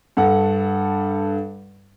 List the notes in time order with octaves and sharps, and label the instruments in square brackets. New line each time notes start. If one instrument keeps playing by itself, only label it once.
[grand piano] G2 A4 F#5